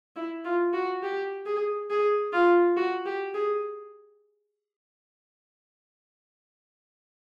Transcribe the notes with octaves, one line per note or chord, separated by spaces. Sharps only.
E4
F4
F#4
G4
G#4
G#4
F4
F#4
G4
G#4